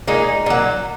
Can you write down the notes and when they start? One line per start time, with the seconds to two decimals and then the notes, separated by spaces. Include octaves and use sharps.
0.07 A#2 G#3 D#4
0.46 A#2 F#3